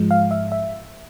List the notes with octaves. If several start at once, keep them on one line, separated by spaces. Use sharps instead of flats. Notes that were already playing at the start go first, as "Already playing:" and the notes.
Already playing: G#2 F3 G#3
F5
E5
E5